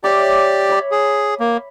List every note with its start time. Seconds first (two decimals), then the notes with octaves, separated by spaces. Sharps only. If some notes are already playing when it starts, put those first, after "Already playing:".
0.04 G4 C#5 D5 E5 D6
0.69 C#5 B5
0.91 G#4
1.40 A#3